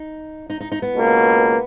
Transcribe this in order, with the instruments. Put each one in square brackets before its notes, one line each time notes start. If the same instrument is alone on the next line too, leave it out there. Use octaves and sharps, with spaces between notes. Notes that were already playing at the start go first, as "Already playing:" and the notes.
Already playing: [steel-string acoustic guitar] D#4
D#4
D#4
D#4
B3
[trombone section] C#2 B2 A#3